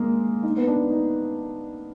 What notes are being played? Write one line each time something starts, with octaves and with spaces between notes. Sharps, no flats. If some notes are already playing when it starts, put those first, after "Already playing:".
Already playing: G#3 A#3
D#4
B3
D4
D#4